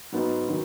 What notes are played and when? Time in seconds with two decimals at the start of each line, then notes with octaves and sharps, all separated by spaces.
0.12 G#2 F#3 B3 D#4
0.48 D#3 F#3